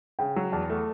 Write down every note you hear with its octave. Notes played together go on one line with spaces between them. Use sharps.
C#3 G5
F#3
E2 A5
A3